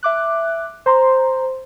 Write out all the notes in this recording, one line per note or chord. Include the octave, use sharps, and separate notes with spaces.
E5 D6 F#6
C5 A#5 C6